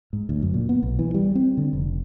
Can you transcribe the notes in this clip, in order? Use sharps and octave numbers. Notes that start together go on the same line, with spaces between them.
G#2
D2
F#2
A#2
B3
B1
E3
G3
C4
D3
F1